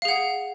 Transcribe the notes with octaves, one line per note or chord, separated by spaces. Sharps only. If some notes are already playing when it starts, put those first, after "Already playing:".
G#4 F5 F#5